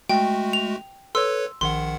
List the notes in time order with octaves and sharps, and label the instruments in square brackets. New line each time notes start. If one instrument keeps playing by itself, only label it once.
[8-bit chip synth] G#3 A3 F#4 [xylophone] G5
[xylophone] F7
[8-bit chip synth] A4 B4 C#5 [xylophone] C6 E6
[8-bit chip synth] A#1 D#3 F#5 [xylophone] C6